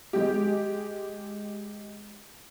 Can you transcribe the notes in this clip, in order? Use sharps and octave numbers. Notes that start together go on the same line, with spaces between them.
G#3 G4